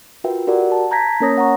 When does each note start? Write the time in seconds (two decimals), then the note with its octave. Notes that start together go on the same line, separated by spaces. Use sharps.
0.24 F4 F#4 A#4 B4 E5 G5
0.47 F#4 G4 A#4 D5 F#5
0.72 A5
0.91 A5 A#5 G6 G#6 A#6 B6
1.20 A#3 C#4 A#4 C#5 D#6 A#6
1.36 C#5 F#5 A#5 C#6